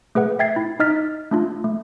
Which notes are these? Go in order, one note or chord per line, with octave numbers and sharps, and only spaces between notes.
A3 G#4 B4 F#5
E5 G5 G#6 A6 C7
E4
D#4 D#5 F6 A6 B6
A3 D4 F4
A3